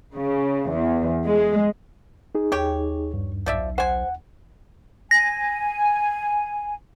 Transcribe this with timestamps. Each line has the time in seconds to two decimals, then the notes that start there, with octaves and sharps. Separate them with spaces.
0.15 C#3
0.71 E2
1.26 G#3
2.35 D#4 G#4
2.52 D#2 G4 C#5 G5
3.14 G2
3.46 B1 F3 D5 E5
3.78 C5 F#5 G#5
5.11 G#5 A#6